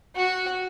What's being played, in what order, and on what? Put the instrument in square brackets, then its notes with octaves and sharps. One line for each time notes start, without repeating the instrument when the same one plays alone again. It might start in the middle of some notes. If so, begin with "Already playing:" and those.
[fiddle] F#4